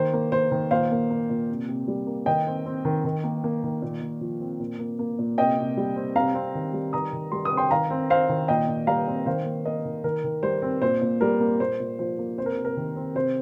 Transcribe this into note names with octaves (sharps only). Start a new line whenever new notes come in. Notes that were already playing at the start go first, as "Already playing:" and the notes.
Already playing: D#3 A#3 C5
A#3
A#3 C5
D#3
A#2 C5 F5
A#3
A#3
A#2
C3
C3
G3
A#3
D#3 D#5 G5
C4
C4
D#3
D#3
A#3
A#3
D#3
A#2
A#2
F3
C4
A#2
A#3
A#3
A#2
C3 D#5 G5
C3
G3
C4
C3 F5 A#5
C4
D#3
G3
D#3 A#5 D#6
D#3
G3 C6
D#6
C4
G5 C6
D#3 F5 A#5
C4
C4 C5 F5
D#3
A#2 D#5 G5
A#2
G3 F5 A#5
C4
D#3 C5 F5
A#3
A#3 A#4 D#5
D#3
D#3 A#4
D#3
G3 C5
C4
A#2 C5
A#2
G3 A#4
A#3
A#2 C5
A#2
F3 C5
A#3
C3 C5
A#4
C3
A#4
D#3
C4
C3 C5